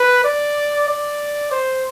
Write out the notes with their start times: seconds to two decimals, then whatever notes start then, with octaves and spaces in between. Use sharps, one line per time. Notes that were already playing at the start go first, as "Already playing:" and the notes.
Already playing: B4
0.24 D5
0.88 D5
1.51 C5